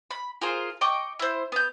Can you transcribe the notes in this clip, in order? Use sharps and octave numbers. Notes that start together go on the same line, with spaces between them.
B5
F4 G#4 A#4 C5
D#5 G5 C#6 D6
E4 C5
B3 G6